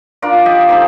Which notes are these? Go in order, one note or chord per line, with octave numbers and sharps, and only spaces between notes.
D4 F4 A#4 D5
G4 D#5
C4 D#4 G4 A4